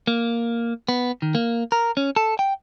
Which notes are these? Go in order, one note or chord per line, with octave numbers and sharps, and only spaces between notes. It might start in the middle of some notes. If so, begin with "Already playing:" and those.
A#3
B3
D#3
A#3
A#4
C#4
A4
G5